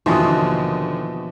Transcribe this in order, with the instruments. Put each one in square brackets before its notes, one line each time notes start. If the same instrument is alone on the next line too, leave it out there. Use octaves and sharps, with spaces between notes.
[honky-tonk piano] D#2 D3 D#6 [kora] B2 E3 F3